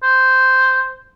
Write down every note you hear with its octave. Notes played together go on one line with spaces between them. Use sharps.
C5